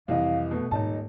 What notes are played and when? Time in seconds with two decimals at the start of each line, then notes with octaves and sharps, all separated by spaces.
0.08 C2 F2 E3 D#5 F5
0.51 B2 A3 B4
0.71 D#1 G#2 D#4 D#5 A5